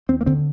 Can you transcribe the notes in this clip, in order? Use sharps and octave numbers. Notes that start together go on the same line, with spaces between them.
D#2 C4
A#3
D3 C4